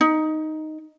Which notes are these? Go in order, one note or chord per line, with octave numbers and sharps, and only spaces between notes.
D#4